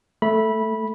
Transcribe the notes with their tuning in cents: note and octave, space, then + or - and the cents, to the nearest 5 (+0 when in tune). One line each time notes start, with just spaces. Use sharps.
A3 +0 B5 -15